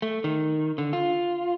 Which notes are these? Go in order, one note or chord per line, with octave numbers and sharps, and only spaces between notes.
A3
D#3
D3
F4